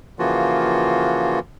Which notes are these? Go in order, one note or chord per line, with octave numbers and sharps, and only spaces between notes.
C#3 E3 F3 A#3 F4 F#4